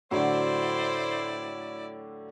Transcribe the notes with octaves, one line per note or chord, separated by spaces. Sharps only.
A2 D3 F#3 D4 E4 C5 D5